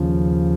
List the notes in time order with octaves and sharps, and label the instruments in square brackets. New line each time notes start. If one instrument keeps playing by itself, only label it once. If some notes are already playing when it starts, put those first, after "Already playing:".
Already playing: [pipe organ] D#2 C#3 F3